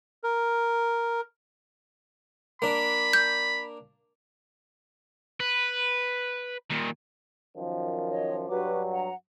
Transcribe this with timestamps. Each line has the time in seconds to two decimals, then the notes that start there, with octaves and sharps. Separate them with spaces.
0.23 A#4
2.62 A#3 D4 B5
3.13 G6
5.40 B4
6.70 A#2 D#3
7.57 F#2 D#3 F3
8.10 C#5 D#5
8.49 G2 F#3 F#4 B4 D6
8.92 F#5 A#5